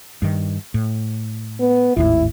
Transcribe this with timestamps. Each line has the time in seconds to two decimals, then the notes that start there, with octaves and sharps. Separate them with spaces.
0.22 G2 D#3
0.74 A2
1.60 B3
1.97 G#1 D#2 A2 E4